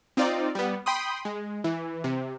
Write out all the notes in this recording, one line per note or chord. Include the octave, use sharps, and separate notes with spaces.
C4 D#4 F4 D5
G3 B3
G5 B5 C6 D#6
G#3
E3
C3